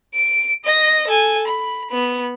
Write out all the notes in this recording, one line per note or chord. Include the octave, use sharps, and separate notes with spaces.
D7
D#5 A#6
A4 G#5
B5
B3 B5